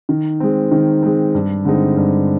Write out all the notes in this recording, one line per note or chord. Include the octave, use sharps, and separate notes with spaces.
D#3
G#3 C4
D#3
G#3 C4
G2
D3 G#3 C4 D#4
G2